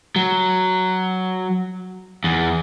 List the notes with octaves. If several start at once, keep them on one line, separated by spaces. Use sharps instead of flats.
F#3
E2